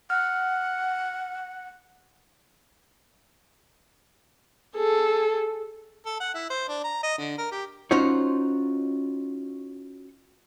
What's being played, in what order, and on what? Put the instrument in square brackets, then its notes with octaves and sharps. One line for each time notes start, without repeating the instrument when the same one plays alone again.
[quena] F#5 [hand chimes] F6
[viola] G#4 A4
[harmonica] A4
F#5
E4
C5
D4
A#5
D#5
D3
A#4
G4
[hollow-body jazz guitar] C#4 D#4 F4 F#4 C5 C#5